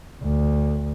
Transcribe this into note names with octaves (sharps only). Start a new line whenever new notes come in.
D2